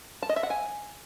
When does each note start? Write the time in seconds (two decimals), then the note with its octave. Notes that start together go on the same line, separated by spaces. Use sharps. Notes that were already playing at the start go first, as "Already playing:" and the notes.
0.23 A5
0.29 D#5
0.36 E5
0.43 F#5
0.50 G#5